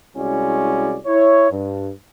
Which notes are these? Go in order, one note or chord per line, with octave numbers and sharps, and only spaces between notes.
C2 G#3 C#4 E4 F#4 D5
E4 C#5
G2